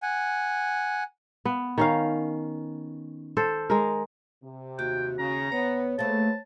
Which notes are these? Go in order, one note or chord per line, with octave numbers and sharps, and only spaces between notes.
F#5 G#5
B3
D#3 C#4 F5
A4 C5
G#3 A#4
C3
D#2 F#4 G5
C#3 A#5
B3 C#5
A3 A#3 G#4 B4 C5 A5